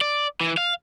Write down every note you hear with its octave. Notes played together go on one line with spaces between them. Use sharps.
D5
E3
F5